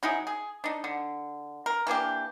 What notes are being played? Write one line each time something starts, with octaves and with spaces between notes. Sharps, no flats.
F#3 D#4 E4 G#4
G#4
D4 D#4
D3
A#4
E3 A#3 D4 G4